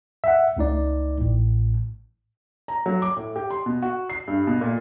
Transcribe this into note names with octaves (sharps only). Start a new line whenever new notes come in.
E5 F#5
C#2 A3 D#4 D5
A1 A2
A#5
F#3
D6
A2
G4
C6
B2
F#4
C7
G2
B2
A#2